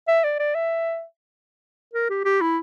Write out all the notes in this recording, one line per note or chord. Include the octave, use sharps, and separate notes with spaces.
E5
D5
D5
E5
A#4
G4
G4
E4